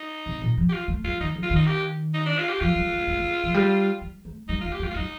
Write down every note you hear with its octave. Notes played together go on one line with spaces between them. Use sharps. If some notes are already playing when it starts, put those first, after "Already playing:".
Already playing: D#4
C3
A#2
F3
G4
F4
A3
G3 F4
D#3 D#4
F3
F4
D#3 D#4
G4
D#4
D4
F4
G4
F3 F4
G3
A3
A3
A#3
F3
G3
G3
A3
G3 D#4
F4
A3
G4
A3 F4
F4
G3 D#4